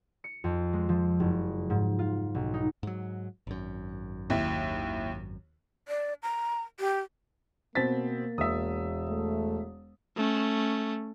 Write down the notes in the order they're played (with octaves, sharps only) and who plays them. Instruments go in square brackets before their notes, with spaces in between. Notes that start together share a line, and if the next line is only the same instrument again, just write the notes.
[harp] C#7
F2
G#3
F3
F#1
G#2
F4
B1
D#4
[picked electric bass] G#2 F#3
G#1 F#2
[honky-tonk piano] D#2 E4
[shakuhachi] D5
A#5
G4
[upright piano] B2 C4 B6 [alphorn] A#3 [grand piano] A6
[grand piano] E1 [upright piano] E5 D#6
[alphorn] A3
[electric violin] A3 C#4